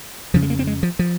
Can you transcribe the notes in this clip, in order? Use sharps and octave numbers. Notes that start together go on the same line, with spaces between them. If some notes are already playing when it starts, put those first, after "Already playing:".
F2 C#3 F3
G#3
A#3
C4
G#3
F3
F3